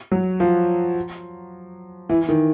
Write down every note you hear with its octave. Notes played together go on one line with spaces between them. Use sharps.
F#3
F3
E3
D#3